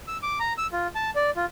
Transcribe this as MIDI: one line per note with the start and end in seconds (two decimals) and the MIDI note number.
0.08 0.17 88
0.22 0.39 86
0.40 0.53 82
0.58 0.67 88
0.73 0.87 65
0.95 1.10 81
1.16 1.31 74
1.36 1.45 65